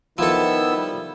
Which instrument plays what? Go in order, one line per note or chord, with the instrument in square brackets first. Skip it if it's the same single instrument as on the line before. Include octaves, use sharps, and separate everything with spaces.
[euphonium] D#3 [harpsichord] F3 A4 [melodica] B3 E4 E6
[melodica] G3